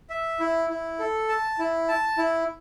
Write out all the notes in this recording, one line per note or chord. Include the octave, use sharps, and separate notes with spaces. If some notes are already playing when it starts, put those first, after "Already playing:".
E5
E4
E4
A4
A5
E4
A5
E4